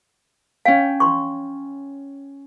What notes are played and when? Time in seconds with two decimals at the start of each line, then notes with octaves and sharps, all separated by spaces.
0.65 C#4 F5 G5
1.00 C6 C#6